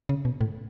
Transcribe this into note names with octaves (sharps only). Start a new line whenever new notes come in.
C#3
B2
A2